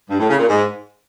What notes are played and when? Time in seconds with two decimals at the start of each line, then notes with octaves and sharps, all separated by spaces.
0.10 G2
0.19 A2
0.29 C#3
0.39 A#2
0.48 G#2